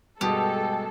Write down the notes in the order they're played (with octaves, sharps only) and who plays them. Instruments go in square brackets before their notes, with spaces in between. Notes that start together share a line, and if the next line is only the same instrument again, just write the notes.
[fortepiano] G2 B2 D#6 [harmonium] G#3 [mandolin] G4 [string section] A4